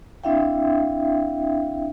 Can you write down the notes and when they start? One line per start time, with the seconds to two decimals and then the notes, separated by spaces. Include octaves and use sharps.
0.24 C4 D4 E4 E5 F5 G5